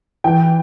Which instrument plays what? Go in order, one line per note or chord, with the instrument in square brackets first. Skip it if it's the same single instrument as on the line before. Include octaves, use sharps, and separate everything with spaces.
[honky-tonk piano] E3 G5